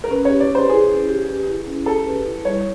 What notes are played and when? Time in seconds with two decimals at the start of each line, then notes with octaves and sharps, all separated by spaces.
0.04 A#4
0.11 C#4 B4
0.25 C#5
0.30 G4
0.40 D5
0.50 B4 C5
0.69 E4 G#4
0.89 C#4
1.09 G4
1.28 B4
1.48 E4
1.67 C#4
1.86 G4 A4
2.06 B4
2.26 E4
2.45 G3 C#5